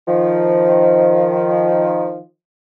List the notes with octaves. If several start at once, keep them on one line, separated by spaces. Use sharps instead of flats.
D#3 F3